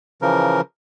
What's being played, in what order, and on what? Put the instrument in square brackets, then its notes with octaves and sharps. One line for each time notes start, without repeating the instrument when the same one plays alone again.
[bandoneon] C#3 E3 F3 A#4